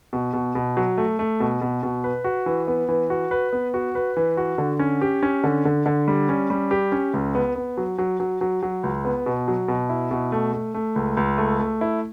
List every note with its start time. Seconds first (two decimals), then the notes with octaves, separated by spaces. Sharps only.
0.13 B2
0.33 B2
0.55 B2
0.77 F#3
0.98 A3
1.19 A3
1.40 B2
1.61 B2
1.83 B2
2.04 B4
2.24 F#4
2.46 E3
2.68 B3
2.89 E3
3.10 F#4
3.31 B4
3.53 B3
3.74 F#4
3.95 B4
4.17 E3
4.37 F#4
4.58 D3
4.79 C#4
5.01 G4
5.23 C#4
5.44 D3
5.65 D3
5.86 D3
6.08 G3
6.29 C#4
6.50 G3
6.71 G4
6.92 C#4
7.14 C#2
7.35 B3
7.55 B3
7.77 F#3
7.98 F#3
8.20 F#3
8.41 F#3
8.63 F#3
8.83 C#2
9.05 B3
9.26 B2
9.48 F#3
9.68 B2
9.90 E4
10.11 B2
10.32 A3
10.53 A3
10.74 A3
10.96 C#2
11.17 C#2
11.38 A3
11.59 A3
11.81 E4